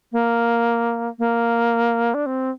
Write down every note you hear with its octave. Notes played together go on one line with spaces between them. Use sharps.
A#3
A#3
D4
C4